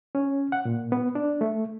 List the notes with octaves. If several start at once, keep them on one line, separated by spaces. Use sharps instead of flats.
C#4
F#5
A#2
B3
D4
A3